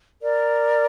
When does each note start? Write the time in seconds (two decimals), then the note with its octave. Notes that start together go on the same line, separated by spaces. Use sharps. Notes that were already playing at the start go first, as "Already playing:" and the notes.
0.22 A#4 D5